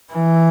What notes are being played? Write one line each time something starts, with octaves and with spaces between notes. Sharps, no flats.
E3